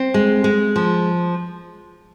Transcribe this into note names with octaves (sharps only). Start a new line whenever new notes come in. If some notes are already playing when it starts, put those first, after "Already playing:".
Already playing: C4
G#3
G#3
F3